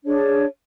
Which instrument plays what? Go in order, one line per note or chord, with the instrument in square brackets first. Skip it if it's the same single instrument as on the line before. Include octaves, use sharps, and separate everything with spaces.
[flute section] D4 G#4 C#5